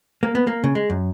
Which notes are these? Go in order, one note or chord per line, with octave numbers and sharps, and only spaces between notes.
A#3
B3
A#3
C#3
G#3
F#2